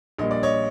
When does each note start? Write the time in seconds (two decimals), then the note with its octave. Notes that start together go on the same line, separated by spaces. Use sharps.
0.18 A#1 A#2 G3 D#5
0.31 D5
0.43 C#5 D#5